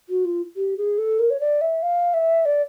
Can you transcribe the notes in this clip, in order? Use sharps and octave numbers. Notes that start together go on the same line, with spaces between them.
F#4
F4
G4
G#4
A4
A#4
C#5
D5
E5
F5
E5
D5